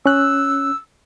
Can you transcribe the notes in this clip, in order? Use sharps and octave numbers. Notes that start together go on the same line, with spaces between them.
C#4 E6 F#6